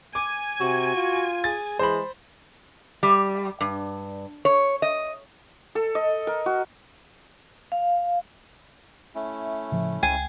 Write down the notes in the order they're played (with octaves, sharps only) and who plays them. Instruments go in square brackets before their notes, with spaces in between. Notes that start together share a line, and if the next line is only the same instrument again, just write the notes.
[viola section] G#5 [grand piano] D6
[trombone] C3 [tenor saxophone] F#4
[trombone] F4
[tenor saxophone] G#4 [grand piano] A6
[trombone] E3 [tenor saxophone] G#3 [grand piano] C5 B5
[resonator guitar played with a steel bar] G3
G2
C#5
D#5
[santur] A4
D#5
A#4
F#4
[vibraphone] F5
[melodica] A3 C#4 E4
[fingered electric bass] A2 C#3 F3
[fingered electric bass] C#2 [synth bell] G5 [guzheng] G#5